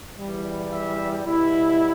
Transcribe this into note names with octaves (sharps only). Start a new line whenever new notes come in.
E2 E3 G3
E5
B2 G3 E4